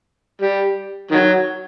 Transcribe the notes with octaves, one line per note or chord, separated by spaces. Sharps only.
G3
D#3 F#3